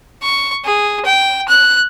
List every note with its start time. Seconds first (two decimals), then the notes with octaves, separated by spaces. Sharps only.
0.22 C#6
0.65 G#4
1.05 G5
1.49 F#6